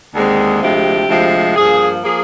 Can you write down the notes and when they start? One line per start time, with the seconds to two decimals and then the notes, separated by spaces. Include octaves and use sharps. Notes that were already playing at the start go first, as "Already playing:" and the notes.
0.14 D#2 D3 G#3 C4
0.62 D2 C3 F3 G#3 G4
1.09 D2 C3 F3 G#3
1.56 G2 F3 A#3 G#4
2.04 F3 A#3 G#4